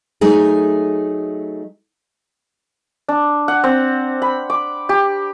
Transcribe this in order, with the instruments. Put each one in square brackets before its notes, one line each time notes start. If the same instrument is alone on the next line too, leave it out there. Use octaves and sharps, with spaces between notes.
[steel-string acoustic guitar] F#3 A3 D#4 G#4
[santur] D4
F#5
C4
B5
D6
G4